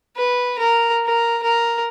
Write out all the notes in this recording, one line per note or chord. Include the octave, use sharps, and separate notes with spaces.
B4
A#4
A#4
A#4